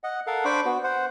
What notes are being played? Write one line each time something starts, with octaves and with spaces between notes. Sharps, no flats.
D#5 F#5
A4 A#4 F5 F#5
D4 C5 B5 C#6 D6
B3 F#4
C5 F#5